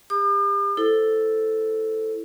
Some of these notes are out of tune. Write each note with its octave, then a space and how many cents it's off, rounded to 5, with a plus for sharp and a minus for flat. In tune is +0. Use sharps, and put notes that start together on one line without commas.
G4 +35 D6 +45
E4 +0 A4 +0 C5 +0